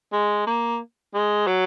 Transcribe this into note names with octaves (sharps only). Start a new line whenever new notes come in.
G#3
A#3
G#3
F#3